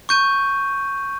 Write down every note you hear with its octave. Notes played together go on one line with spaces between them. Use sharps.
C#6 G6 D#7